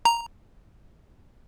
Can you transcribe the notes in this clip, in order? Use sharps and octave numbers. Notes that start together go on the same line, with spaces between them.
A#5